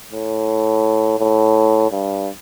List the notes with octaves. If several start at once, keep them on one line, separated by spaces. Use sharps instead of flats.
A2
A2
G2